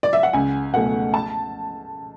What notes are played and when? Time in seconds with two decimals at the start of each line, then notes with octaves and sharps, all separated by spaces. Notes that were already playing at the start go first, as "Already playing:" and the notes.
0.03 D5
0.13 E5
0.23 F#5
0.33 C#2 G#5
0.74 B2 A3 F#5
1.14 A5